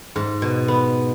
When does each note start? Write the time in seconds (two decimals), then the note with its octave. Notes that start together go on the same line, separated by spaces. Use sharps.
0.16 G#2
0.42 B2
0.68 B3